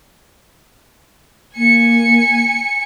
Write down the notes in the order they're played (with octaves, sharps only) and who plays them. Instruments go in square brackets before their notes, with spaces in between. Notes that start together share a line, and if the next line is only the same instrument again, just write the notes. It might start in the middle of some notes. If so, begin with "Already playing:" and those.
[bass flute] A#3 [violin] G#5 C#7